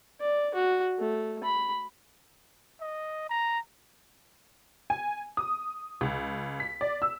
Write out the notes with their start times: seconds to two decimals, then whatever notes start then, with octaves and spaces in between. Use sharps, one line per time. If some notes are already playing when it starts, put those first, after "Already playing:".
0.20 D5
0.54 F#4
0.99 A3
1.43 B5
2.80 D#5
3.29 A#5
4.90 G#5
5.37 D#6
6.01 C#2
6.60 B6
6.81 D5
7.02 E6